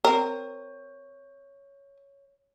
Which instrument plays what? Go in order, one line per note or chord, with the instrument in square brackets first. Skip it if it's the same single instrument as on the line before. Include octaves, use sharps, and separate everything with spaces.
[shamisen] C4 A#4 [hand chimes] C#5